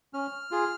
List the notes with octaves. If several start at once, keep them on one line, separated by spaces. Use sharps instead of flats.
C#4 F6
F4 G#4